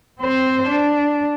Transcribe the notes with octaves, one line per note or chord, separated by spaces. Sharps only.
C4 C5
D4